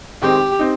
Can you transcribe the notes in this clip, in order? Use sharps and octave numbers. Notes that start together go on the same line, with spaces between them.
D#3 G#3 C4 D#4 G4
C4 D#4